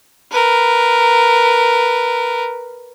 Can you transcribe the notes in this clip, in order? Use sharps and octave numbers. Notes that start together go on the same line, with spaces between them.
A#4 B4